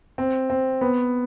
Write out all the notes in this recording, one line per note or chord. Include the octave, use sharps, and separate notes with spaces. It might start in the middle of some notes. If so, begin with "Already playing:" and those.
C4
C4
B3